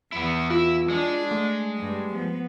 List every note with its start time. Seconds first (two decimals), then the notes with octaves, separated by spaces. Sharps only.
0.12 E2 B3 E4
0.50 E4 F4
0.90 G#3 D4
1.31 A3
1.76 G2 G3
2.13 F3 B3